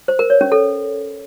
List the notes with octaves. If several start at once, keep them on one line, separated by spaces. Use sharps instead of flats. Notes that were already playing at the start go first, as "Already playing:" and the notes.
C5
A#4
C#5
C#4
A4